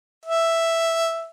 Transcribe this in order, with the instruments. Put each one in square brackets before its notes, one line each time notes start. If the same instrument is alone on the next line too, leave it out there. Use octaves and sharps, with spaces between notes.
[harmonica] E5